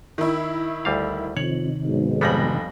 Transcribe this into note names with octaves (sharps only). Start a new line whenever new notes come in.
D#3 E4
D2 G3 F5
F2 C3 D#3 C#5 F#7
B1 G#2
F1 F2 G3 B3 A#6 F#7